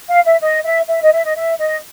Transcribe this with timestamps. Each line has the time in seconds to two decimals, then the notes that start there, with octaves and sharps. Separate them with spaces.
0.09 F5
0.25 E5
0.41 D#5
0.65 E5
0.88 E5
1.02 D#5
1.13 E5
1.25 D#5
1.36 E5
1.60 D#5